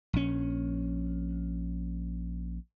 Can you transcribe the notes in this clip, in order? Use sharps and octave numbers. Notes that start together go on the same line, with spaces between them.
A#1 C#4